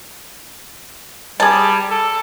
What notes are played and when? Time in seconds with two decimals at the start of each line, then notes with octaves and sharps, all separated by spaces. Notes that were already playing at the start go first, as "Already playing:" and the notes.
1.40 G3 G#4 A5
1.90 A4